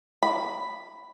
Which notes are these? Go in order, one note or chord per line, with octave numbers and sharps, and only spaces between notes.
B5